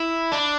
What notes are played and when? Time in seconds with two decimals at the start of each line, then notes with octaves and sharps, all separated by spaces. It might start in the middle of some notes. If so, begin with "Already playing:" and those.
Already playing: E4
0.33 D4